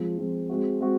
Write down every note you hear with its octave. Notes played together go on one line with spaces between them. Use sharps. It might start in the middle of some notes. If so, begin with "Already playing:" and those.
Already playing: F3 G#3 C4
F3 G#3 C4
G#3 C4 F#4
G#3 C4 F#4